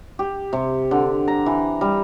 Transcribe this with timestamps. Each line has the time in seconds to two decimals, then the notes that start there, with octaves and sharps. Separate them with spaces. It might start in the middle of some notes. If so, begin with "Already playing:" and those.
0.19 G4
0.53 C3
0.91 D3
1.28 A#5
1.46 E3
1.81 G3